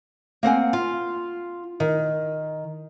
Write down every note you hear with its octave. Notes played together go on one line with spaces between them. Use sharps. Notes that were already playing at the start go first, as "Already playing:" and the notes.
A#3 C4 F#5 G#5
F4
D#3